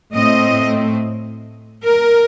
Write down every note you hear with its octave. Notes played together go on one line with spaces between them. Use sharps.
A2 A3 C4 D#5
A#4